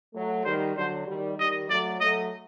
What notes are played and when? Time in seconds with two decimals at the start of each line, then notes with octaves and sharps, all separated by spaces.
0.14 F#3 A3
0.45 D#3 G3 C5
0.76 D3 F#3 C5
1.07 D#3 G3
1.39 D#3 G3 D#5
1.70 F#3 A3 D5
2.00 F#3 A3 D#5